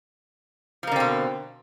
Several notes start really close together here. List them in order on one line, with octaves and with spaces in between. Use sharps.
F3 A#3 D3 C4 B2